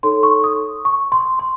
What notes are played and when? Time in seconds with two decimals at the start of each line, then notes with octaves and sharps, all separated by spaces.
0.03 D#4 A4 C#5 C6
0.23 C#6
0.44 D#6
0.85 C#6
1.12 C6
1.39 C6